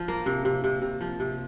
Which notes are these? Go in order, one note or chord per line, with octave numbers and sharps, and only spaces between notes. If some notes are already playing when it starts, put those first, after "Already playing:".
Already playing: F3
A#3
C3
C3
C3
C3
F3
C3